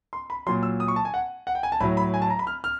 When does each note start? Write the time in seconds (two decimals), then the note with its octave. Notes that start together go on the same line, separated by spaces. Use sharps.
0.13 C6
0.30 B5
0.47 A#2 F#3 C6
0.63 E6
0.80 D#6
0.88 C#6
0.96 A5
1.05 G#5
1.14 F#5
1.47 F#5
1.55 G5
1.63 G#5
1.72 A5
1.80 A2 F#3 B5
1.97 B5
2.14 G#5
2.22 A5
2.30 A#5
2.39 B5
2.47 F6
2.64 F6